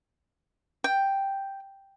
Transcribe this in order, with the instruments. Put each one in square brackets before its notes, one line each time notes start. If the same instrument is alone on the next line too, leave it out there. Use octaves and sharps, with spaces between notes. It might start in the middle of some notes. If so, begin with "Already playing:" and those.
[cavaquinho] G5